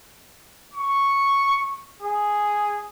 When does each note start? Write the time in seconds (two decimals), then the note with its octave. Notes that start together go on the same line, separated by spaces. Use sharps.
0.74 C#6
2.03 G#4